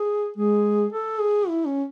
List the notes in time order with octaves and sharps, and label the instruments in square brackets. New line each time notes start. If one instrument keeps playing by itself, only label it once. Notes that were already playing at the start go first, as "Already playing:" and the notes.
Already playing: [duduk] G#4
[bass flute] G#3 [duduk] G#4
[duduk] A4
G#4
E4
C#4